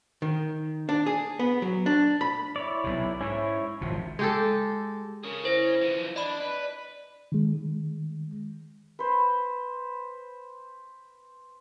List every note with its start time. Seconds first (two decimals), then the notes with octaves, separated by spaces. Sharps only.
0.22 D#3
0.89 D4
1.06 G#4
1.39 B3
1.62 F#3
1.86 D4
2.21 B5
2.56 E4 C#5 D5
2.84 B1 C3
3.21 G#2 C#4 E4 C#5
3.81 G#1 C3 F3
4.19 G#3 G4 A4
5.24 C#3 G#4 A#4
5.45 E4 C5 A#6
5.82 E3 F3
6.16 D4 D5 D#5 B5
6.41 B4
7.32 D#3 G#3
8.99 B4 C5